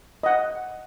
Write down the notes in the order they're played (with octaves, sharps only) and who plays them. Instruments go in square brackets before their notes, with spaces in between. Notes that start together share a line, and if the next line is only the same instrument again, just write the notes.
[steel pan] D#5 F#5